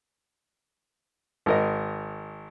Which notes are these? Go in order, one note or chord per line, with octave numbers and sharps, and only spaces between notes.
G#1 A#4 D#5